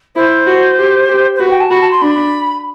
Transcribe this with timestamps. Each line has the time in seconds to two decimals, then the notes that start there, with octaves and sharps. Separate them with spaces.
0.16 E4 C5
0.46 F#4
0.78 G4
1.09 G4
1.35 C5
1.40 F#4 B4
1.50 G5
1.61 A5
1.71 F#4 B5
1.81 A5
1.91 C6
2.02 D4 B5